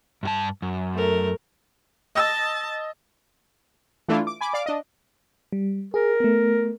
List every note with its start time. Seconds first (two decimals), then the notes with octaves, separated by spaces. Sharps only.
0.23 G2 F#4 A5
0.62 F#2
0.93 A3 A#4
2.15 D#5 A5 E6
4.08 E3 A3 D4 E4 F4
4.27 D6
4.41 G#5 B5 D6
4.53 D5 F5 D6
4.66 D4 D#5
5.53 G3
5.94 G#4 A#4
6.20 A3 B3